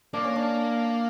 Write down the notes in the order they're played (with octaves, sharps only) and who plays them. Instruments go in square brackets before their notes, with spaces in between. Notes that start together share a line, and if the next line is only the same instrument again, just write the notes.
[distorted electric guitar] A#3 [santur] D4
[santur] C#4
D4